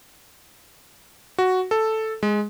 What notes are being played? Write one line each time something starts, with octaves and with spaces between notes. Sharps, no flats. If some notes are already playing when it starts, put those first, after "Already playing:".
F#4
A4
G#3